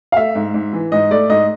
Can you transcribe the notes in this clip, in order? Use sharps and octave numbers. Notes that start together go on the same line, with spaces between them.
F5
A3 E5
G#2
G#2
E3
G#2 D#5
A3 D5
G#2 D#5